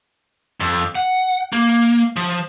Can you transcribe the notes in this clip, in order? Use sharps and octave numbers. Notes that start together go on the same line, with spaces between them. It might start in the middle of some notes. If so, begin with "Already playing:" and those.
F2
F#5
A#3
F3